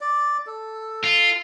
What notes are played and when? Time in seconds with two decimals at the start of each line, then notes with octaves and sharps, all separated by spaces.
0.01 D5
0.47 A4
1.03 F4